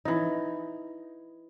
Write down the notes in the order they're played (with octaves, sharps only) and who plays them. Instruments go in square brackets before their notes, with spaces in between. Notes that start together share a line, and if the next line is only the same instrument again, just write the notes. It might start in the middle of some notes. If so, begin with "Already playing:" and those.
[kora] E3 D#4